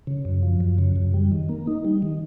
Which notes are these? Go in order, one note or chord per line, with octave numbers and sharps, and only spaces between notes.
C#3
F#2
F3
F#2
C#3
F#2
G3
D#3
A#3
D#4
G3
D#3